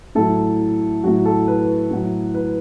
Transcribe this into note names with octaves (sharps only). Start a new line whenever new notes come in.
A2 F#3 A4
A2 F#3 F#4
A4
B4
A2 F#3
B4